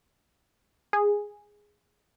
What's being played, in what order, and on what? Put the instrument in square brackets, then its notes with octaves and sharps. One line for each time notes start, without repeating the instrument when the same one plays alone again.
[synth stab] G#4